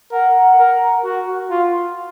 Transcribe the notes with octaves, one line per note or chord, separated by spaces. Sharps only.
A#4 F#5
A#4
F#4
F4